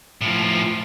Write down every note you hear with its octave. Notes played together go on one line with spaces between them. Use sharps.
A2 F3